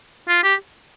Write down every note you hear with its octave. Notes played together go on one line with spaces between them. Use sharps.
F4
G4